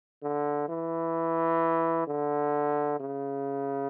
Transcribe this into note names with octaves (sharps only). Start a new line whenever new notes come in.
D3
E3
D3
C#3